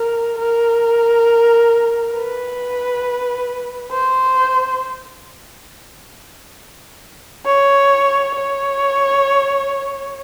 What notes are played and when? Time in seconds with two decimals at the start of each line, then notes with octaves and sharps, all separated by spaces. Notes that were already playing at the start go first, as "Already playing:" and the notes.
Already playing: A#4
0.38 A#4
2.15 B4
3.92 C5
7.46 C#5
8.35 C#5